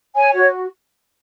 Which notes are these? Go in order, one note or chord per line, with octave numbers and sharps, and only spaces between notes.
C#5 G#5
F#4